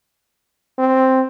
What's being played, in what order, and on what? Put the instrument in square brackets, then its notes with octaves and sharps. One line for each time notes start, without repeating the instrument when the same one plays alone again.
[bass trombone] C4